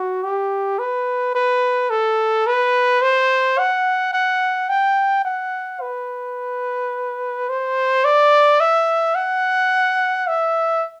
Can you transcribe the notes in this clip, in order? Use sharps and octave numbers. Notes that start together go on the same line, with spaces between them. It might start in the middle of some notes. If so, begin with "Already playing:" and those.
Already playing: F#4
G4
B4
B4
A4
B4
C5
F#5
F#5
G5
F#5
B4
C5
D5
E5
F#5
E5